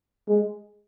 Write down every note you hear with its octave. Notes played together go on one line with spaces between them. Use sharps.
G#3